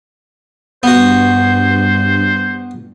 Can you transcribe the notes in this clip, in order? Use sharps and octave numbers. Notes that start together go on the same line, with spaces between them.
G2 B3 F#4 C5